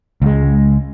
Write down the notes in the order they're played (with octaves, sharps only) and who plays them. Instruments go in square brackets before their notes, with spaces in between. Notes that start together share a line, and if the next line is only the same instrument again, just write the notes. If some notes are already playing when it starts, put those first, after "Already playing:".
[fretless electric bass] C#2 G#3